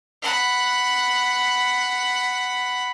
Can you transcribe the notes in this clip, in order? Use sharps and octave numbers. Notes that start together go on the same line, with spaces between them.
F#5 B5